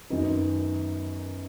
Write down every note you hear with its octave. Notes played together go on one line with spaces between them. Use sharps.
F#2 D#3 F#3 B3 D#4